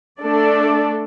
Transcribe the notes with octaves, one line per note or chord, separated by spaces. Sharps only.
A3 D4 A4 D5